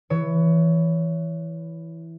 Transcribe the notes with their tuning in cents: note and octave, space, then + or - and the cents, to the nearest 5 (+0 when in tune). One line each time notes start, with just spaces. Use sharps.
E3 +0 C#5 +20